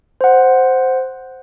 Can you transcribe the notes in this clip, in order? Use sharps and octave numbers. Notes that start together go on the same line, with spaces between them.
C5 F#5